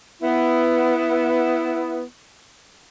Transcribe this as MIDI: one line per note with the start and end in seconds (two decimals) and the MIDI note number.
0.22 2.02 59
0.22 2.02 64